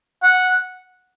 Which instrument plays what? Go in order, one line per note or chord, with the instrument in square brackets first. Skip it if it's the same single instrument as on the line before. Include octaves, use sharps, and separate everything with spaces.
[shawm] F#5